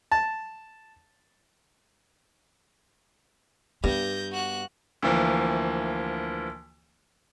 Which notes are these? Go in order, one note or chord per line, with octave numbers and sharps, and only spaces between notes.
A5
G2 B3 G6 A#6
F#4 F#6
D2 E3 F3 A#3